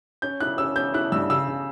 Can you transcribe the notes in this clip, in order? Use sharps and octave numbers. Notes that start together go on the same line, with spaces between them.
C#4 G6
E4 F#6
C#4 E6
C#4 G6
E4 F#6
G2 E6
C#3 E6
C#3